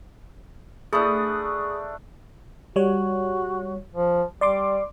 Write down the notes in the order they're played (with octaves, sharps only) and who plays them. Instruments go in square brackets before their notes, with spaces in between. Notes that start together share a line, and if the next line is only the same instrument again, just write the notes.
[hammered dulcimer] A3 D4 [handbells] G#4 B5 D#6
[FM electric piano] G3 C#5 [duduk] F#4
[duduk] F3
[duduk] G3 [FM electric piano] D5 C6 D6